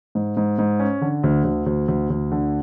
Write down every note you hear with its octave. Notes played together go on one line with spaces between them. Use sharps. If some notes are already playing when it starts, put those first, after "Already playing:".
G#2
G#2
G#2
C#4
D3
D2
D2
D2
D2
D2
D3